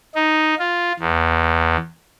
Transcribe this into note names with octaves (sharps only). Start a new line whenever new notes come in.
D#4
F4
E2